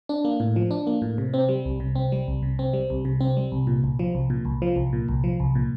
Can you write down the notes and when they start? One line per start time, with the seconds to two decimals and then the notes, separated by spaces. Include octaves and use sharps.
0.09 D4
0.25 A#3
0.40 A2
0.56 F3
0.71 D4
0.87 A#3
1.02 A2
1.18 C3
1.34 C4
1.49 G3
1.65 C2
1.80 C3
1.95 C4
2.12 G3
2.28 C2
2.43 C3
2.59 C4
2.73 G3
2.90 C2
3.05 C3
3.21 C4
3.37 G3
3.52 C2
3.67 A#2
3.84 C2
3.99 F3
4.15 C2
4.30 A#2
4.45 C2
4.62 F3
4.76 C2
4.93 A#2
5.09 C2
5.24 F3
5.40 C2
5.55 A#2